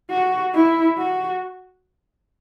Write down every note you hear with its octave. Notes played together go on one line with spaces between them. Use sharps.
F#4
E4
F#4